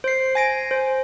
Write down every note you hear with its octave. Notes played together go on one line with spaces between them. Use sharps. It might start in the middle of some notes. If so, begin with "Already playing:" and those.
C5 C7
G#5 A#6 D7
C5